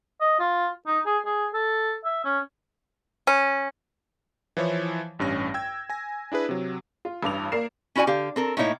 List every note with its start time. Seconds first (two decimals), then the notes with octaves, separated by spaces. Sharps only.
0.21 D#5
0.39 F4
0.87 D#4
1.06 G#4
1.26 G#4
1.54 A4
2.05 E5
2.25 C#4
3.27 C#4
4.57 E3 F3 E4 C#5
5.19 A1 G2 C#4 A#6
5.54 G5 E6 G#6
5.90 G#5 A#6
6.32 D4 E4 G#4 B4
6.49 C3 F#3
7.05 F4
7.23 A1 G2 D6 F7
7.52 A#3 A#4 D5 C7 E7
7.95 C#4 E4 F#4 D5 G#5
8.07 D3 G4 F5
8.36 C4 A4 A#4
8.57 A2 A#3 D#4 E4 C#5